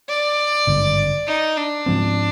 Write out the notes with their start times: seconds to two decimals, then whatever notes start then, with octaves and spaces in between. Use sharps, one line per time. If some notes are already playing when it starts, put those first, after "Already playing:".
0.09 D5
0.67 G#1 G2 D3
1.27 D#4
1.57 D4
1.86 G#2 F3 C4